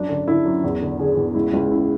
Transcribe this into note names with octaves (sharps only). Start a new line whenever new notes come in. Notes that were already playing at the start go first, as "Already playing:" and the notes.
Already playing: F#2 D4
D3
D3 E4
F#2
E2
D3
D3 G#4
E2
C#2 E4
C#2
C#3 E4